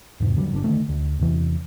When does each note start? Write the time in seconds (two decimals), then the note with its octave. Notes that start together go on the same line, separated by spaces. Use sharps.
0.20 E2 G#2 C3
0.36 D3 F#3 G3
0.52 G1 D3 C#4 D4
0.64 D3 D#3 A3
0.89 D2
1.19 E2 C3 E3